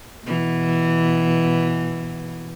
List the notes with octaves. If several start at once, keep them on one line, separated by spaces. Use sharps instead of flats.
B2 E3